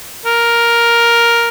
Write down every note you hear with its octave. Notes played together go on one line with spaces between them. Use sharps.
A#4